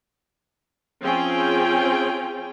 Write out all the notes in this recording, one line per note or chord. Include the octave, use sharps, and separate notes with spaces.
F3 C4 C#4 F4 G#4 G5